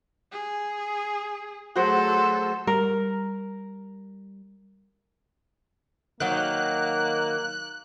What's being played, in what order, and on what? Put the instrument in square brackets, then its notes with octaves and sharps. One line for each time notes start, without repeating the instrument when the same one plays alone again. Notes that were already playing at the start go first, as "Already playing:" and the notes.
[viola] G#4
[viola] F#3 A4 [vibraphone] A3 G#4 F#5 [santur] F#4 C5
[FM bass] G3 [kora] A#4
[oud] D#3 F#3 [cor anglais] A#3 [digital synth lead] F#6